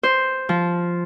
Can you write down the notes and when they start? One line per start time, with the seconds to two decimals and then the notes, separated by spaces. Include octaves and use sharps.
0.03 C5
0.49 F3